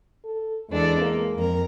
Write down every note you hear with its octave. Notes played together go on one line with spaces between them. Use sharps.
A4
E2 G#3 D4 A4
A#3
F2 A#4